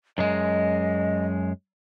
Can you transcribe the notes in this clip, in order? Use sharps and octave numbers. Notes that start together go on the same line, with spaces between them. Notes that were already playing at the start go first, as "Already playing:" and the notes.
F#2 G#3 D#5